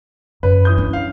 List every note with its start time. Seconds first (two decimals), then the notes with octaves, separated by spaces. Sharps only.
0.43 F#2 B4
0.65 E3 D#6 G6
0.78 C#4 D4
0.93 F5